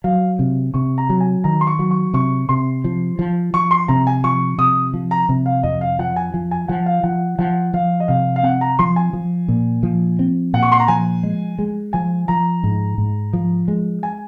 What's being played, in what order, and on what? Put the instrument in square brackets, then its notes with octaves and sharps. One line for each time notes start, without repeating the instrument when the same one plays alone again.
[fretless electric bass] F#3 [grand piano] F5
[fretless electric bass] C3
[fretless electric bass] C3 [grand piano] C#6
[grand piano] A#5
[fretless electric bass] F#3
[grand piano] G#5
[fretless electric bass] D#3 [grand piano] A#5
[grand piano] C6
C#6
[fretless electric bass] F#3
[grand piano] C#6
[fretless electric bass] C3 [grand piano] C#6
[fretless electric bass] C3 [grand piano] C6
[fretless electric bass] F3
F3
[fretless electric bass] F3 [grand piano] C#6
[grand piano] C6
[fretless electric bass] C3 [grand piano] A#5
[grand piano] G#5
[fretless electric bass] F3 [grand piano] C#6
[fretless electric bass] C3 [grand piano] D#6
[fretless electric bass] F3
[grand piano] A#5
[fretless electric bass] C3
[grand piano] F5
[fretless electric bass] F2 [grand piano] D#5
[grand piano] F5
[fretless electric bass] F3 [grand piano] F#5
[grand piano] G#5
[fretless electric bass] F3
[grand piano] G#5
[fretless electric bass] F3 [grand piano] F#5
[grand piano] F5
[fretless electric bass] F3 [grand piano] F#5
[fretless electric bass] F3 [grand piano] F#5
[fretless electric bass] F3 [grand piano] F5
[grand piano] D#5
[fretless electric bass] C3 [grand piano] F5
[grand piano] F5
[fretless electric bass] C4 [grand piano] F#5
[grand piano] A#5
[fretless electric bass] F3 [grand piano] C6
[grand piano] G#5
[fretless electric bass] F3
A#2
F3
C4
[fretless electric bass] A#2 [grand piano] F#5
[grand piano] C#6
C6
A#5
[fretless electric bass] F3 [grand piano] G#5
[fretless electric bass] G#3
G#3
[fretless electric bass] F3 [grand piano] G#5
[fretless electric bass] F3 [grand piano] A#5
[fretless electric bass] G#2
G#2
F3
G#3
[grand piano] G#5